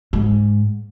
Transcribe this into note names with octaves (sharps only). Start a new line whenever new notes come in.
G#2